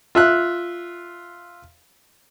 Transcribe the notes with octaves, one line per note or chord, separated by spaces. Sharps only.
F4 E5 F#6